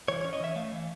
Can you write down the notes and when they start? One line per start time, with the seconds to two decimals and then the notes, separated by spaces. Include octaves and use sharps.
0.08 E3 C#5
0.21 C#5
0.25 C#4
0.33 D#5
0.40 E3 E5
0.56 A3 F5
0.72 E3